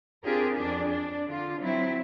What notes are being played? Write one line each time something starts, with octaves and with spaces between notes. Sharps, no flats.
C4 D4 F4 G4 G#4 A#4
F2 D4 G#4
D4
D3 F4
F#3 C4 E4